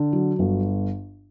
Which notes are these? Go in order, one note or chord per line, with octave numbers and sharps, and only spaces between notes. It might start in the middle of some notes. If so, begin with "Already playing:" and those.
Already playing: D3
F#3
G1